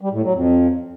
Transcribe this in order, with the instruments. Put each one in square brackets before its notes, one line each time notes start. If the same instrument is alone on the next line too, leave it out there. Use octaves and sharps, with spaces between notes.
[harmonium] G3
A2
F#3
F2